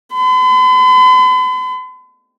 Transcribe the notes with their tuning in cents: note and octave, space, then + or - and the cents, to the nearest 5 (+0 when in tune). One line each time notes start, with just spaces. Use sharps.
B5 +45